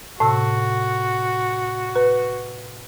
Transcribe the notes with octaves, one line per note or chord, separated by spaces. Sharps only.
A2 C3 F#4 A5 E6
B4